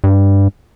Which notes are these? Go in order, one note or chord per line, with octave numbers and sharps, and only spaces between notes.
G2